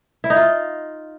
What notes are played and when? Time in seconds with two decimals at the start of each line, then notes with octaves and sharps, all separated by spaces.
0.24 E4
0.30 D#4
0.36 F4